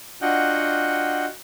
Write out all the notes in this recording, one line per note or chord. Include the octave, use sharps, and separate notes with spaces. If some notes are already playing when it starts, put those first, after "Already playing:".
D4 F4 F#4 D#5 F#5 G5